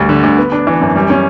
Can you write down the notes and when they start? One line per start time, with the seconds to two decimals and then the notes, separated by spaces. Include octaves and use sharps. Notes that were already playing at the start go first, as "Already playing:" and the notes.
Already playing: D2 G3
0.09 D3
0.23 D2
0.37 B3
0.52 D4
0.67 E3
0.81 F#2
0.96 G3
1.10 C#4